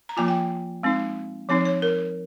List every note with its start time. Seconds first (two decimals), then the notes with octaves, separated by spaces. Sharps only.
0.09 A#5
0.17 F3 A#3 F4 G#5
0.28 G5
0.83 G#3 C4 D#4
1.49 F3 C4 D#4 C#5
1.65 C#5
1.82 A#4